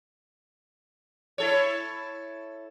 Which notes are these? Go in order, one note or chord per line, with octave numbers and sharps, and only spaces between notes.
E4 A4 C#5